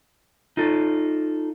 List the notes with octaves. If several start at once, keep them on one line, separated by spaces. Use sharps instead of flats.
D#4 F4 A4